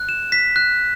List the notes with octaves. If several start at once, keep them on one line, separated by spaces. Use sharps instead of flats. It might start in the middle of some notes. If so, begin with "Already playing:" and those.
Already playing: F#6
E7
B6
F#6